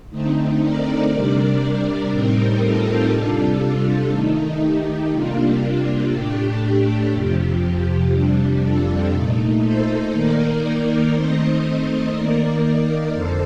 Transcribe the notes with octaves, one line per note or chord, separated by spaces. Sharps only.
D3 A3 C4 D#4
A#4 D5
C3 G3 D4 A#4 D5
A2 G3 C4 D#4 G4 A#4
F4 A4
C3 G3 D4 F4 A4
F4
D#3 A3 D#4
G4
C3 G3 A#3 D4 F4
F4
A2 A3 D4 G4
F2 C3 F3 G4
F2 C3 G3 D4
F4 A4
A#2 A3 D#4
A4 C5
D#3 A#3 D#4 A#4 D5
D#3 A3 C4 D#4 C5 D#5
D#3 A#3 D#4 A#4 D5
F2 D3 A4 C5